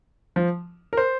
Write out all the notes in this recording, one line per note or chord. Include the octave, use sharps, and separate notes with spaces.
F3
A#4
C5